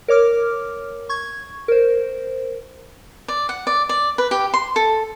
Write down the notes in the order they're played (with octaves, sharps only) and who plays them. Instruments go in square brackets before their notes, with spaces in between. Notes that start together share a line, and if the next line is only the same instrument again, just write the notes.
[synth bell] A#4 C#5 D6 F6
C#6 G#6
A#4 C5
[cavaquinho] D5
F#5
D5
D5
B4
G4
C6
A4